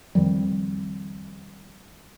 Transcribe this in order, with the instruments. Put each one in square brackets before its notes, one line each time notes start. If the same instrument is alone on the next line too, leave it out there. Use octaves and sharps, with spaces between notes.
[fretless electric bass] F2 D#3 F3 G3